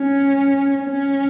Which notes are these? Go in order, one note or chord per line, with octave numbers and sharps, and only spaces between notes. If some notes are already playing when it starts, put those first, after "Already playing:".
Already playing: C#4
C#4